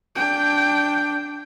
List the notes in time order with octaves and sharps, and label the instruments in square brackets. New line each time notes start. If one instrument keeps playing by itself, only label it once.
[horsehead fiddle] D4 G5